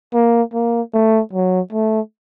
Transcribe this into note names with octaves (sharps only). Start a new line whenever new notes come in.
A#3
A#3
A3
F#3
A3